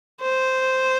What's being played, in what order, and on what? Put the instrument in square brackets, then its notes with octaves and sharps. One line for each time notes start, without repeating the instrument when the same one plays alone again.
[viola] C5